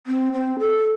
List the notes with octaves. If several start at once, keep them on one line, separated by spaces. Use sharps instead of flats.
C4
C4
A4